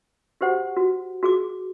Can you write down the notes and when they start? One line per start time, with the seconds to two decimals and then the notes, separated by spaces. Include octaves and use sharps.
0.41 F#4 G4 C5 F#5
0.77 F#4
1.23 F#4 G#4 D6